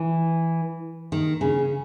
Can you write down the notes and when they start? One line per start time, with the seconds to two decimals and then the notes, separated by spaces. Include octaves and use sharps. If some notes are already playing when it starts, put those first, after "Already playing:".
Already playing: E3
1.12 D#3
1.41 C#3